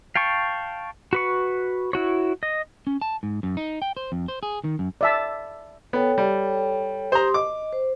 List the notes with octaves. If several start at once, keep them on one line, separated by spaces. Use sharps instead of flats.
F5 G5 A5 C#6
F#4 B4 C#6
E4 F#4 C#5
D#5
C#4
A5
G#2
F#2
D#4
G5
C5
F2
C5
G#4
D#3
F#2
D5 E5 A5
B3 A4 C#5 G5
G3
G4 C5 A#5 C6 D#6
D#5 D6
C5